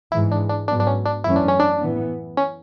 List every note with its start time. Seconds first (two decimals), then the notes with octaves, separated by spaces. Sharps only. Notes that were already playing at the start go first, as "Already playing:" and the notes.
0.12 G#2 E3 G#3 E4
0.32 D4
0.49 D4
0.68 G#2 F#3 B3 D4
0.80 D4
0.87 C#4
1.06 D4
1.24 F#2 E3 A3 C#4 E4
1.36 D4
1.48 C#4
1.60 D4
1.81 A2 E3 B3
2.37 C#4